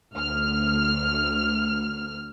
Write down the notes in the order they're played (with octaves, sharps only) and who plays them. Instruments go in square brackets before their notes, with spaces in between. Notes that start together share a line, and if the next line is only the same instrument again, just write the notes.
[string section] D2 F6